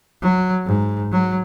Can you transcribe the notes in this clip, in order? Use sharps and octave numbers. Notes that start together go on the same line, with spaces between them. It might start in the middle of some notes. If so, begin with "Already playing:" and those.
F#3
G#2
F#3